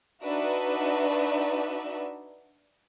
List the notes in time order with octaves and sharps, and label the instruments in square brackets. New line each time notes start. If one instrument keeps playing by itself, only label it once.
[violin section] D4 D#4 F#4 B4 D5 E5